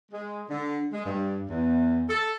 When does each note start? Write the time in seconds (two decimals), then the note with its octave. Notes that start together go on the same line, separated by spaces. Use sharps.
0.12 G#3
0.49 D3
0.92 G#3
1.05 G2
1.49 E2
2.09 A4